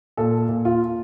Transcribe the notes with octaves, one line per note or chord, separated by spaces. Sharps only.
A#2 A4
A#2
F4